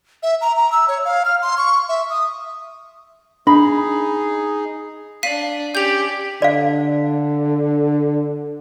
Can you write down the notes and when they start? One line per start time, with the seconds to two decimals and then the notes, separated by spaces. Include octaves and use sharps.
0.23 E5
0.41 A#5
0.57 A#5
0.72 E6
0.88 C#5
1.05 F5
1.25 F6
1.42 C6
1.57 C#6
1.89 E5
2.10 D#6
3.47 D4 D#4 G#4 B5
5.23 D4 D5 F5 B6 D#7
5.75 C#4 G4 D5 G6 F7
6.42 D3 D5 F5